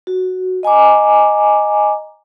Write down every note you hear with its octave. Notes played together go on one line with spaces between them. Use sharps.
F#4
D#5 G#5 A#5 D6